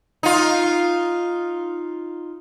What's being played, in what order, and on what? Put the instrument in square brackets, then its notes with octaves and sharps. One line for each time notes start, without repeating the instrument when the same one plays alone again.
[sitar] D#4 F4